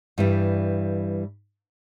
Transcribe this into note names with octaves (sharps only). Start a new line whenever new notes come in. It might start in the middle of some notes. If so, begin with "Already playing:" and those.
G2 E3 G3